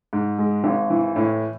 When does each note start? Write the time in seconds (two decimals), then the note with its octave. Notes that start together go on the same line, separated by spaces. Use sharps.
0.13 G#2
0.39 G#3
0.64 G#1
0.90 E3
1.16 A2